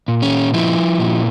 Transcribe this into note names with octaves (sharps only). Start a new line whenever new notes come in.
A#2
C#4
F3 E4
A#2